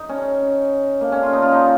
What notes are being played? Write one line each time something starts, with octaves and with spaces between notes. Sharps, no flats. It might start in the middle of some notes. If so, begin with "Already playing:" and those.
Already playing: D#4
C#4
A#3
C#4
F4
D#4
F4
D#4